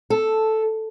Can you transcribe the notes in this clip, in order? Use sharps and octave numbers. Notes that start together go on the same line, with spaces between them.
A4